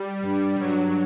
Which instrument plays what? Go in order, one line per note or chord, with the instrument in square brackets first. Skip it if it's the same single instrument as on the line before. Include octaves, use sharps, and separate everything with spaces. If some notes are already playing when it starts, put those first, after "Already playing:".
Already playing: [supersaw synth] G3
[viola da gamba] G2
[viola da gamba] G2 [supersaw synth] F#3